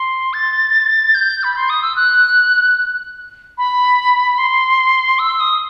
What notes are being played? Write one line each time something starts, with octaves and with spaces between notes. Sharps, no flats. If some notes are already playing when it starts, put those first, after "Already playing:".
Already playing: C6
A6
G6
B5
C6
D#6
E6
F#6
B5
C6
E6
D#6